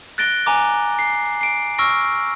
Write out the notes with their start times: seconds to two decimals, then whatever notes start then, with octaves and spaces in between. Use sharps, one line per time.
0.18 F#6 A6 A#6 D7 G7
0.46 G#5 A#5 D6
0.99 C7
1.41 C7 D7
1.79 C#6 E6 F6 A#6 D7